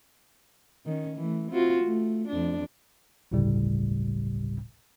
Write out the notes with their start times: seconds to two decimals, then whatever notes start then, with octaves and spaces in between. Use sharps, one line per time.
0.86 D#3 C#4
1.17 E3 A3
1.51 C4 F4 F#4
1.84 A3
2.28 F2 D4
3.32 G1 D2 A2 C#3 G3